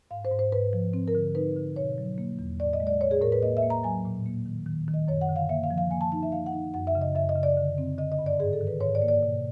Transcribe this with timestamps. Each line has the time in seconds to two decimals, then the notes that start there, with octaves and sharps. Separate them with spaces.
0.11 G#2 F5
0.25 C5
0.31 G#2
0.39 C5
0.52 G#2 B4
0.73 F3
0.94 C4
1.08 A#4
1.15 D3
1.35 D#4 B4
1.56 D3
1.76 B2 C#5
1.98 F#3
2.18 A#3
2.39 E2
2.60 A2 D5
2.73 D#5
2.80 G#3
2.87 D5
3.01 A2 C#5
3.11 G#4
3.21 A2 A#4
3.32 B4
3.42 A#3 D#5
3.57 E5
3.63 A#3
3.70 A#5
3.83 F#3 G#5
4.05 A#2
4.26 A#3
4.46 D#3
4.66 D#3
4.88 D#3
4.94 D#5
5.08 F#2 C#5
5.21 F#5
5.29 D3
5.36 F5
5.49 A#3 E5
5.64 F5
5.71 F3
5.78 F5
5.91 A#3 G#5
6.01 A5
6.12 D#4 A5
6.23 E5
6.32 A#3 F5
6.46 F#5
6.53 D#4
6.74 F#2 F#5
6.87 E5
6.95 C#3
7.01 D#5
7.15 F#2 E5
7.29 D#5
7.36 C#3
7.43 D5
7.57 D3
7.78 C4
7.98 D3 D#5
8.12 D#5
8.19 G2
8.26 D5
8.40 G#2 G#4
8.53 A4
8.61 D#3
8.67 B4
8.81 G#2 C#5
8.95 D5
9.02 A#3
9.08 D5
9.23 B2